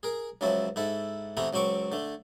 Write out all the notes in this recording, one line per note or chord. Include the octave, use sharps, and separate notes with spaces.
G#4 A#4
C#2 C#3 F3 F#3 E4 A5
G#2 E4 A4
C3 E3 A3 B3 E4 A#5
C#2 F#3 C4 C#6 D6
D3 A3